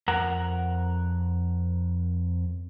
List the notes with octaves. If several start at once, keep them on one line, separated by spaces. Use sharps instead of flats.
F2 A#4 F#5 A#5